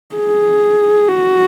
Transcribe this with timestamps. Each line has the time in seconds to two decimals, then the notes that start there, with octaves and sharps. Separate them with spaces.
0.15 G#4
1.08 F#4